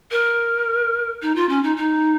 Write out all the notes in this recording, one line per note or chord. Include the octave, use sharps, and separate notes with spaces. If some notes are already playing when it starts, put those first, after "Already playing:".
A#4
D#4
F4
C#4
D#4
D#4